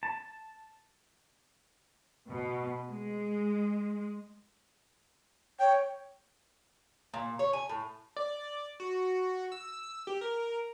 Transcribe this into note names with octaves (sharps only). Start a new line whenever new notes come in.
A5
B2
G#3
C#5 G5
A#2
C#5
G#5
A2
D5
F#4
E6
G4
A#4